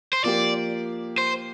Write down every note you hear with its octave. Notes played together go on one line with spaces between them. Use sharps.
C5
F3 A#3 G4 D5
C5